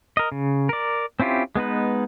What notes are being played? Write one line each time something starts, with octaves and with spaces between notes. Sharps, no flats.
A#4 D#5
C#3
A#4 D5
C4 C#4 E4 F4 G4
G#3 B3 D#4 B4